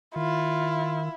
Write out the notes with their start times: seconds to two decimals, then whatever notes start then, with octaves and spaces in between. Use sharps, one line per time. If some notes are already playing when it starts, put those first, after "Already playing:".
0.16 D#3 E4 F4